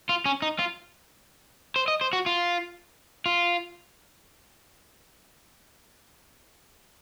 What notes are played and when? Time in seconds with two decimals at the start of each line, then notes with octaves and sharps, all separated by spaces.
0.09 F4
0.26 C#4
0.42 D#4
0.59 F4
1.76 C5
1.88 D#5
2.01 C5
2.13 F#4
2.26 F4
3.26 F4